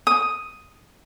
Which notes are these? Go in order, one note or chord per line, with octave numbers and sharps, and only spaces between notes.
D#6